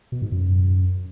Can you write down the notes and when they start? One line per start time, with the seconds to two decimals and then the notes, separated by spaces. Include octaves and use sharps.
0.12 B2
0.22 G#2
0.32 F#2